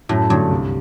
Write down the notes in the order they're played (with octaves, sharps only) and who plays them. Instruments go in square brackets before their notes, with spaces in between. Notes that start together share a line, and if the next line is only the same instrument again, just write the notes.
[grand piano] F#2 [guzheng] A2
[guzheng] G2 [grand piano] D3 F#3 A3
[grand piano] C2